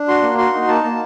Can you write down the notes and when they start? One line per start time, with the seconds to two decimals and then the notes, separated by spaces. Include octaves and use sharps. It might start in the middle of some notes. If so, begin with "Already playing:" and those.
Already playing: D4
0.08 F#4 C6
0.22 A#3
0.38 F#4 C6
0.53 D#4
0.68 A#3 A5
0.84 A#3